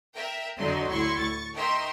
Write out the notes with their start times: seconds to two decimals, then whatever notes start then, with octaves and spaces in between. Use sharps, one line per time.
0.15 A#4 E5 G5
0.58 F2 D3 F#3 D#4 F#4 C6
0.90 D2 A2 E4 C6 C#6
1.19 C#6 A6
1.55 D#4 A#4 E5 G5 C6 C#6